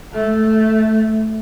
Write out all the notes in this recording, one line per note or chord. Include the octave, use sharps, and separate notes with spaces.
A3